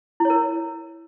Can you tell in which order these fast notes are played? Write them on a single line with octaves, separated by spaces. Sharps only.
E4 C#5 A#4